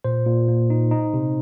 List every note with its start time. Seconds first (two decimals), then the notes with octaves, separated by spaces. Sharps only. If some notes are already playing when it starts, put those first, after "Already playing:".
0.04 A#2 C5
0.26 A#2
0.48 A#3
0.70 D#4
0.91 D#4
1.14 C3